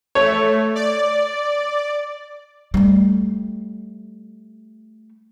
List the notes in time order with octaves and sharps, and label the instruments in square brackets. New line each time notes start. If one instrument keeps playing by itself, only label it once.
[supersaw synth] A3 [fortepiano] C#5
[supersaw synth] D5
[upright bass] G3 A3